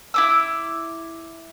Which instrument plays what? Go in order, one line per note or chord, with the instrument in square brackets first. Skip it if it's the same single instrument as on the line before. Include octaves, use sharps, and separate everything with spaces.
[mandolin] E4 D6 E6